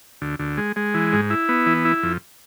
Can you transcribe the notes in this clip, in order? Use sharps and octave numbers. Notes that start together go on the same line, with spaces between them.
D2
D2
G#3
G#3
E3
G#2
E4
B3
E3
E4
F2